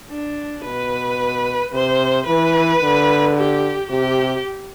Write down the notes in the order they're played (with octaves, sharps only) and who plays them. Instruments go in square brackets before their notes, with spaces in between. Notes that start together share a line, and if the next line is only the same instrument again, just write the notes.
[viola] D4
[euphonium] B2 [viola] B4
[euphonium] C3 [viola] C5
[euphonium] E3 [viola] B4
[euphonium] D3
[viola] G4
[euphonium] C3 [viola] G4